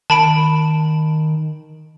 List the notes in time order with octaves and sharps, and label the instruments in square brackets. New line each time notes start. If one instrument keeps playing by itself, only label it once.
[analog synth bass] D#3 [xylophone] A5 B5 D7